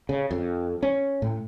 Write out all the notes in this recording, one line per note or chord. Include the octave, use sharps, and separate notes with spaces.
C#3
F2
C#4
A2